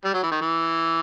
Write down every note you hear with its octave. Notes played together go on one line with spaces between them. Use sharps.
G3
F#3
E3
D#3
E3